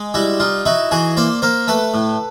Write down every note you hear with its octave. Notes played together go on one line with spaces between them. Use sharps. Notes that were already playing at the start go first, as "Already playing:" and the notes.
Already playing: G#3
G3 E4 F#4
D#4 F4
D#4 E4 F#4
E3 F#4 G#4
A#3 C5 D5
A#3 A#4 C5
A3 A4 B4
A2